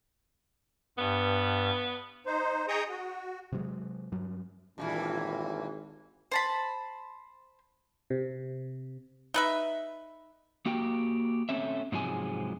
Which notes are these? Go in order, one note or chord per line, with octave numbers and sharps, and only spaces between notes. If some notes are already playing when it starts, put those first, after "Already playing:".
G2 B3
D#4 C5
G#4 D#5 G5 A#5 C#6 D#6
F#4
C3 F#3 G#3
G2 F#3
G#1 G2 A#2 E3
C5 A5 B5
C3
D#4 B4 E5
A#3 F#4 G4 G5
A3 C4 C#4 E5
G#2 C3 F3 F#3 G#3 G#5